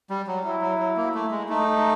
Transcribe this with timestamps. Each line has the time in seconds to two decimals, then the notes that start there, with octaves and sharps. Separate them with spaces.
0.10 G3
0.27 F#3
0.44 F#3 E4
0.62 F#3
0.79 F#3
0.97 A#3
1.14 A3
1.31 G#3
1.49 A3 D#4